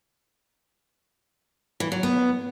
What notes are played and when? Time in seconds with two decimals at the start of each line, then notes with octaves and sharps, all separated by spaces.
1.80 E3
1.92 F#3
2.03 B3